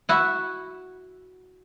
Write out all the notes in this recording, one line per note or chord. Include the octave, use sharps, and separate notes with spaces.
E4 F#4 E5